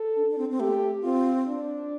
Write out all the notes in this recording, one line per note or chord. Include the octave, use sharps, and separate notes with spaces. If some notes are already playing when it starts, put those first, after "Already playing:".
Already playing: A4
D4
D4
C4
C4
A3 G4
C4 F4
D4